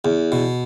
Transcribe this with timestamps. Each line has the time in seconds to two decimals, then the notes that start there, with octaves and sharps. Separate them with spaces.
0.05 E2
0.32 B2